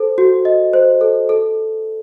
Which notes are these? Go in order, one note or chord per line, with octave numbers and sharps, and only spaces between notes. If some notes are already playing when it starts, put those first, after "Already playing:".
Already playing: A4 C5
F#4
D#5
C5
A4
A4